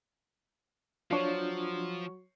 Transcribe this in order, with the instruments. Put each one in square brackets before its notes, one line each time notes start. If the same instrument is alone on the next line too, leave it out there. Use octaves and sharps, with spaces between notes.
[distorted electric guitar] F3 [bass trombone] F#3 [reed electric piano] D4 F4 [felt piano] C#5 C#6 C7